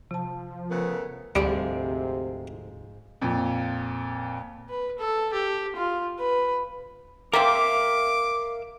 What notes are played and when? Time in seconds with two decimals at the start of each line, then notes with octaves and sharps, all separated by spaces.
0.11 C3 F3 A5
0.70 C#3 A3 B3 A#4
1.36 D2 G#2 C3 F3 G3 G#3
3.21 F2 A#2
4.69 B4
4.98 A4
5.33 G4
5.76 F4
6.19 B4
7.33 A#3 C4 A#4 E5 F5 D6